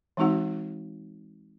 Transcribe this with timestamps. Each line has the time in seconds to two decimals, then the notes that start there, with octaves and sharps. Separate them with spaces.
0.17 E3 G#3 C4 D#4 F#4 F#5